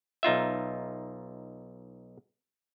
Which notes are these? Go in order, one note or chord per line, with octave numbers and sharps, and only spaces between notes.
B1 D#4 F4 E5